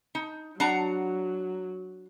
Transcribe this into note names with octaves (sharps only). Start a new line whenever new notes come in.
D#4
F#3 D4 F#5 A#5